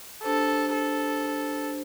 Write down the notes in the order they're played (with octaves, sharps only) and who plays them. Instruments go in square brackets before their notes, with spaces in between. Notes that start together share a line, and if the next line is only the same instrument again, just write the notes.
[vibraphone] D4 G4 C5 [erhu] A4
[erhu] A4